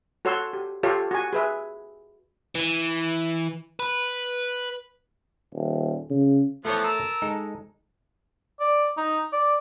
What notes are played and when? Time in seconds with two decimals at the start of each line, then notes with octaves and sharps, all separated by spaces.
0.25 F#4 A4 C#5 F#5 C6 E6
0.53 G4
0.83 F4 G4 A4 C#5 F5
1.11 F#4 G#5
1.33 G#4 B4 E5
2.55 E3
3.80 B4
5.54 D#1
6.10 C#3
6.65 E3 F3 A3 B3 A4 C#5
6.84 A#4 A5 E6
7.22 G#3 D#4 A4
8.60 D5
8.97 D#4
9.32 D5